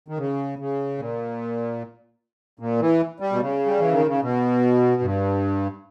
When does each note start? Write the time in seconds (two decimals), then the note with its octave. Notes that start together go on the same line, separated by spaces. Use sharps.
0.08 D#3
0.18 C#3
0.59 C#3
0.98 A#2
2.59 A#2
2.80 E3
3.20 G3
3.32 B2
3.40 C#3
3.66 G3
3.80 E3
3.93 D#3
4.07 C#3
4.22 B2
5.02 G2